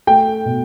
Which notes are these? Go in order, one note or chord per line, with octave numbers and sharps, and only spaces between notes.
A3 G5
B2